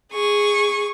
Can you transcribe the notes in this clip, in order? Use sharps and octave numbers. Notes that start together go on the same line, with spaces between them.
G#4 C#6